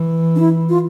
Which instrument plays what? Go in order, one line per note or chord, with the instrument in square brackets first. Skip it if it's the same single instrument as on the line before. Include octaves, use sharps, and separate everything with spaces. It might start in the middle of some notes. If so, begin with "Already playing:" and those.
Already playing: [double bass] E3
[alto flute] D4
E4
F4